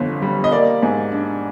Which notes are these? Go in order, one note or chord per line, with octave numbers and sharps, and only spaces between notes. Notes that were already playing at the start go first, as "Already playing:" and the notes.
Already playing: G1 F2 D3
G3
D#5
A#3 D5
G#2
D4